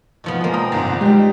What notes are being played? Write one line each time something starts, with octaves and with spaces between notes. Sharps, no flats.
B2 F3 B3
G#3 A#3
G5 A#5 D#6
G1 C2 D#3
G3 G#3 G4